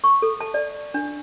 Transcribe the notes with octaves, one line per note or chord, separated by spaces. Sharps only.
C#6
A4
A5
D5
D4